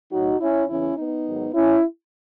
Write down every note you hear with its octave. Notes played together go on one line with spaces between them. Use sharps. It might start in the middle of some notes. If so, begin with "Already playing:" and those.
A2 F#3 D#4 F#4
C#4 E4
E2 C#3 E3 C#4 E4
B3 D#4
G#2 D#3 F#3
C#4 E4